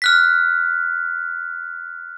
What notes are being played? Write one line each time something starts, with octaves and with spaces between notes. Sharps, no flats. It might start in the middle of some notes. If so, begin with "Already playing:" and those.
F6 F#6 B6